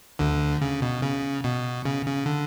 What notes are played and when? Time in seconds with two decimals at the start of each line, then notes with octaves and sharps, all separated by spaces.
0.19 D2 D3
0.61 C#3
0.82 B2
1.02 C#3
1.44 B2
1.85 C#3
2.06 C#3
2.26 D3